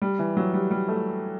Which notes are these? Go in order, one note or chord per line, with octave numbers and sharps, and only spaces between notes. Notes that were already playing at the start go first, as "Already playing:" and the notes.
G3
E3
F#3
G3
G3
A3